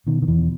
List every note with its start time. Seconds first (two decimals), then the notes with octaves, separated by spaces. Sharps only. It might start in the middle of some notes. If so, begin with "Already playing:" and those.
0.07 B2 D#3
0.22 D#3
0.27 E2 E3
0.38 B2